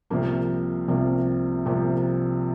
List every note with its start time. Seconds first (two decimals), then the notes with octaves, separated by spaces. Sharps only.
0.10 C2 C3 F3 A#3
0.88 C2 C3 F3 A#3
1.66 C2 C3 F3 A#3